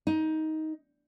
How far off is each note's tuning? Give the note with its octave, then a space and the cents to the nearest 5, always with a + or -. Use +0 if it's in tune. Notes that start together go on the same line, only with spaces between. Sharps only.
D#4 +15